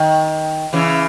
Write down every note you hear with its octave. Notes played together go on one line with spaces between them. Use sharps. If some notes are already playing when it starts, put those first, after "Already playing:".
Already playing: D#3
C#3 E3